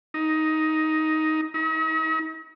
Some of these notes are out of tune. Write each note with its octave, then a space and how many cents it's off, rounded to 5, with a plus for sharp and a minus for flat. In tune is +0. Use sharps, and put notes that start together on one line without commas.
D#4 +10
D#4 +45